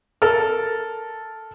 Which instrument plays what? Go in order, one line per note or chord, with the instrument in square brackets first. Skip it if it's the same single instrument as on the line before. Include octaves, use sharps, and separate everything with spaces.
[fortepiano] A4 A#4 F6